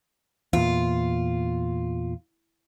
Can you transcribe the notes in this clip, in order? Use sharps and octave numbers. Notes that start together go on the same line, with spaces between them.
E2 A#2 F4